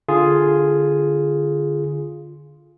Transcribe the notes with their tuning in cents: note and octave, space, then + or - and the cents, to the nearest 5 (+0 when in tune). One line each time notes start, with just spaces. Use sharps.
D3 +0 F4 +0 G#4 +0